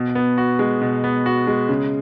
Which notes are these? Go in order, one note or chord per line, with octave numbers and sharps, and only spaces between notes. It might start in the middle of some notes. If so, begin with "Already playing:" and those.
Already playing: B2
B3
F#4
G#3
B2
B3
F#4
G#3
C#3